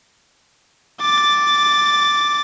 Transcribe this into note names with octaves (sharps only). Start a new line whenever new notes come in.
D6 A6